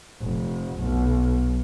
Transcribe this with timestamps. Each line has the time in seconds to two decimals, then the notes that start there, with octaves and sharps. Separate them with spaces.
0.22 F1
0.80 B1